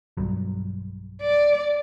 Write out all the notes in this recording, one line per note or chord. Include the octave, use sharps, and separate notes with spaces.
B1 G2 F#3
D5